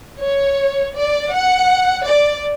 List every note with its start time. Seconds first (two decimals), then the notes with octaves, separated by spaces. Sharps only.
0.21 C#5
0.94 D5
1.32 F#5
2.06 D5